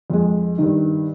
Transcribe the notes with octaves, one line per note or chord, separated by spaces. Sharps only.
F2 G#3
G2 D#3